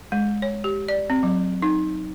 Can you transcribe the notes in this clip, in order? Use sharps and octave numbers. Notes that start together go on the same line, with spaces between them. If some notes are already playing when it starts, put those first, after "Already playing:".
G#3
C#5
G4
D5
C4
F#3
D#4